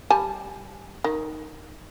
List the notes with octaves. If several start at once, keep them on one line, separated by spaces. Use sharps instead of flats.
G3 G#5 A5
D#3